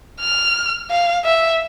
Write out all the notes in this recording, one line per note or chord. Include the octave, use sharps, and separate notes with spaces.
F6
F5
E5